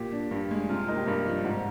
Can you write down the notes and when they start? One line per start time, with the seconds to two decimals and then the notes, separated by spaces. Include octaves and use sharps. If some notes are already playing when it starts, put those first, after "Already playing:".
Already playing: A#2 G4
0.12 D4
0.31 G2
0.51 G#3
0.69 C3 F4
0.88 A#3 D#4
0.97 G4
1.07 G2 A#4
1.26 F3
1.44 G#2